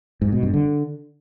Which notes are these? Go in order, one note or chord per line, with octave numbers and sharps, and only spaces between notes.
G#2
B2
G2
D3